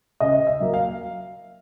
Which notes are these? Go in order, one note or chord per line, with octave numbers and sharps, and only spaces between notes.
C#3 D#5
E5
F#3 A#3
F5